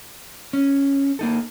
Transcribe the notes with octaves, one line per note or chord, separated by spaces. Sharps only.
C#4
A#3 D#4 A4